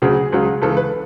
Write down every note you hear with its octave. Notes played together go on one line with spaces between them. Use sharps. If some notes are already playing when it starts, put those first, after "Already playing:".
D2 C#3 F#3 G#4
C#2 C#3 F#3
C#2 C#3 E3 A4
B4